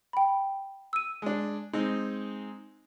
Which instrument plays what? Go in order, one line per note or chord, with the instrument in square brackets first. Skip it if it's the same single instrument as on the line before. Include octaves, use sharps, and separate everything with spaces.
[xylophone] G5 B5
E6 D#7
[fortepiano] G#3 D4
G#3 C4 D#4